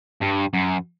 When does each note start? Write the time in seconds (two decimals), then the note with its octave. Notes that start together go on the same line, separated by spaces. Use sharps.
0.21 G2
0.53 F#2